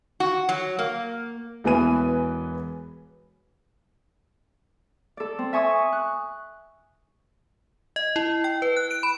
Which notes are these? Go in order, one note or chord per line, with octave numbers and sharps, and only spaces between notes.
F#4
F#3
A#3
E1 E3 B3 B4 G#5 D#7
A4 D5
C4
E5 G#5 C#6 D#6
F#6
D#5
E4
G5
B4
F#6
D7
B5